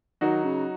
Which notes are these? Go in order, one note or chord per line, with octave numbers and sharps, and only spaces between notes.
D#3 F#3 D#4 F#4
C#3